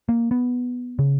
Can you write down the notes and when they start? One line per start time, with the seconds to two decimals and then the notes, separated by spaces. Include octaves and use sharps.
0.09 A#3
0.31 B3
0.99 C#3